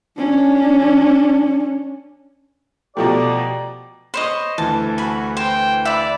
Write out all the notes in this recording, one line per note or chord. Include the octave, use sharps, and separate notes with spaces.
C#4 D4
B2 F3 A3 G4 D5 A#5
C5 C#5 D#5 B5 D#7
D2 E3 A5
F#4 G#5 B5
C5 G5
D5 E5 B5